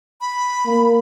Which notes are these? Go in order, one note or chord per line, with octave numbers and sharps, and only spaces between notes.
B5
A#3